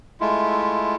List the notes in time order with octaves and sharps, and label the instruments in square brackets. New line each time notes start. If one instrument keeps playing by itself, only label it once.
[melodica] G#3 A3 E4 F4